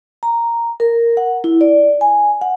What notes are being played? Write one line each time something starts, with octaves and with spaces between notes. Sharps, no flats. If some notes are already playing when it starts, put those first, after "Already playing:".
A#5
A#4
F#5
E4
D5
G#5
F#5